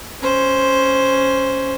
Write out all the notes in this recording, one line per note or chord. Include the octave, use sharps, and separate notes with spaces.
C#4 C5